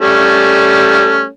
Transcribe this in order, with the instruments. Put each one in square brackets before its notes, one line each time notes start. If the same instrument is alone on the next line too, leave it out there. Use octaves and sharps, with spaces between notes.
[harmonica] G3 A3 C#4